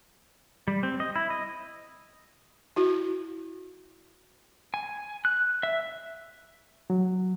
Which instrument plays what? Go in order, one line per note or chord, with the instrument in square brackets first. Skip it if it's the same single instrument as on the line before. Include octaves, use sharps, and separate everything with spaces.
[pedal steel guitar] G3
C4
D#5
E4
D#5
[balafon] E4 F#4
[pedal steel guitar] G#5
F#6
E5
[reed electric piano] F#3